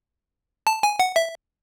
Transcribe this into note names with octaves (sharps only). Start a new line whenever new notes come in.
A5
G#5
F#5
E5